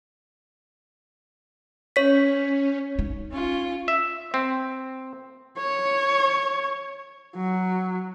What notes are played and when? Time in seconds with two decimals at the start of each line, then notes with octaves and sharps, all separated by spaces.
1.96 C#4 C#5 B6
2.99 D#4
3.32 C#4 F4
3.88 E5
4.34 C4
5.58 C#5
7.36 F#3